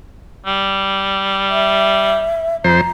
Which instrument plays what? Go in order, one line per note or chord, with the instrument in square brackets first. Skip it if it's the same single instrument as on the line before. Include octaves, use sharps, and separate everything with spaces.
[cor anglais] G3
[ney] E5
[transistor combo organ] F2 C5 [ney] A#5